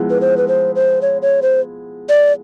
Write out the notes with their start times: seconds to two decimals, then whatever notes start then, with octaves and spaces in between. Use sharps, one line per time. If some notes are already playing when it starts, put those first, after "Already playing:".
Already playing: F3 G#3 B3 E4
0.10 B4
0.21 C5
0.37 B4
0.48 C5
0.75 C5
1.02 C#5
1.22 C#5
1.42 C5
2.09 D5